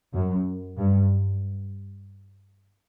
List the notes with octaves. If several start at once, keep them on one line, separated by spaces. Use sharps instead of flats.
F#2
G2